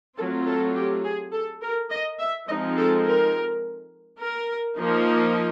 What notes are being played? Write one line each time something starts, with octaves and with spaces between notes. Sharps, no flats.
F#3 A3 C4 F4 A4
A4
G4
G#4
A4
A#4
D#5
E5
F3 G#3 C4 D#4 D#5
A4
A#4
A#4
F3 A#3 D#4